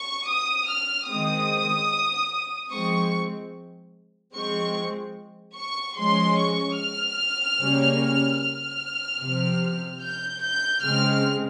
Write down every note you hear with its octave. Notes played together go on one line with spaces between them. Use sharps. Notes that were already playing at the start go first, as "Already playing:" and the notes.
Already playing: C#6
D#6
F6
D#3 G#3 C4 D#6
F3 G#3 C4 C#6
F3 G#3 C4 C#6
C#6
F3 G#3 C#4 C6
C#6
F6
C#3 G3 A#3 C#4
F6
C3 F3 C4
G6
G6
C#3 G#3 C4 F6